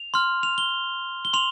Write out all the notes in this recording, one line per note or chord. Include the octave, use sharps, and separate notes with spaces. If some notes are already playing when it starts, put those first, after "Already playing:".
Already playing: F7
C6 F6
F7
G7
G7
C6 F7